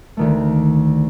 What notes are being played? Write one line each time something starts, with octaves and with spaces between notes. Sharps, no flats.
D2 D#3 A3